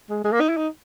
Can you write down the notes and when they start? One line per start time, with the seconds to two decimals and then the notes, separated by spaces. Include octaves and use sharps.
0.10 G#3
0.25 G#3
0.33 A#3
0.41 D#4
0.49 E4
0.57 D#4